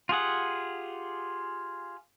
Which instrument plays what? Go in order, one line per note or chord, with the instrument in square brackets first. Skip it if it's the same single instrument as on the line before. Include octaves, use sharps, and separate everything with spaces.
[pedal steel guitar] F4 G4 G#4 F#5